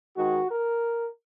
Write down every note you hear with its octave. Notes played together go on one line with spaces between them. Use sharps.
G#2 D#3 G#3 F#4
A#4